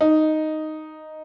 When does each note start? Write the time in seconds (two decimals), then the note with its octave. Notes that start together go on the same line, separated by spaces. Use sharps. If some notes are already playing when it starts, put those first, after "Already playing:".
0.01 D#4